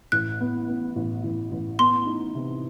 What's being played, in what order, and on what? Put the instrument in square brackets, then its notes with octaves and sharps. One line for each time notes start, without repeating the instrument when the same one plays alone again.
[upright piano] A1 [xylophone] F#6
[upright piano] B3
B3
A1
A1
A1
[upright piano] B3 [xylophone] C6
[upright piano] D#4
C3